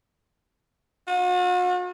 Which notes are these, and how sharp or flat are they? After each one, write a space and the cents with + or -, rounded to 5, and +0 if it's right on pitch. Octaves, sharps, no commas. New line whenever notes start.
F#4 -45